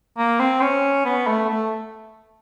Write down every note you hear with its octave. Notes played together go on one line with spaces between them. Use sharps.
A#3
C4
C#4
B3
A3
A3